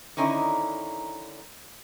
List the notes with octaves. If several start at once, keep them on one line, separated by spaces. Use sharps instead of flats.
D3 D#3 C#4 D#4 E4